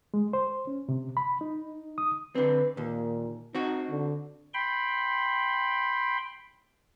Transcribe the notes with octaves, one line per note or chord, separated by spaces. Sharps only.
G#3
C5
C#4
C3
B5
D#4
D#6
D3 C4 B4
D#2 A#2
C4 D#4 F#4
D3
G5 B5 C6